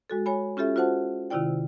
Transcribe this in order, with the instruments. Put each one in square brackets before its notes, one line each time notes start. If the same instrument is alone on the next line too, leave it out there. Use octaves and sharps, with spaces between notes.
[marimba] G#3 F#4 A4
C#5 G#5 B5
C#4 F4 G4 A4 E5
F4 F#4 C5 F#5 A5
C3 D#3 E4 F4 D5 G5